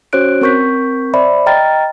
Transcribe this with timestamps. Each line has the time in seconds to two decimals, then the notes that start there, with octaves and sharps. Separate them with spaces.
0.13 C#4 F#4 C5 C#5 F#6 D7
0.41 C4 A#4 C#6 G6 B6
1.14 C5 D5 E5 B5
1.46 D#5 G5 A#5 F6 A6